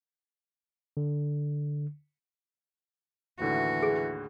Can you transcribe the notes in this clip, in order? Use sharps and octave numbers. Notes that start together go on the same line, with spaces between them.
D3
D#2 A2 D3 E3 F#4
G#4